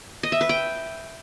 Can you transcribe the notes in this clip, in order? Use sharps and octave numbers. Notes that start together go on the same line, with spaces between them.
D#5
E5
B4
G5